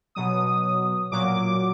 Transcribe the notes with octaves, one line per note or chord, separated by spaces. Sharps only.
B2 F#3 D#6
A#2 F#3 D6